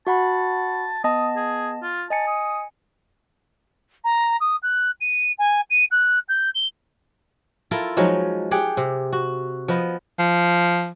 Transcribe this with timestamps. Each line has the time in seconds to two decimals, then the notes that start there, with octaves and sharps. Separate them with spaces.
0.07 F#4 F#5 A5 B5
1.04 B3 D#5 A5 D#6
1.36 G#4
1.82 F4
2.10 D#5 G#5 A5 C#7
2.27 D#6
4.04 A#5
4.40 D#6
4.62 F#6
5.00 D#7
5.38 G#5
5.70 D#7
5.91 F#6
6.29 G6
6.55 G7
7.71 E4 F4 A4 A#4
7.97 F3 F#3 G#3 D#4
8.51 G4 G#4 F#5 G5
8.77 C3
9.13 F#4
9.68 F3 B3 D#5
10.19 F3